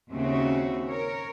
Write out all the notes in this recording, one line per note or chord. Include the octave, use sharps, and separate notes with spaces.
D#2 C#3 C4 C#4 F#4 E5
A#4 C#5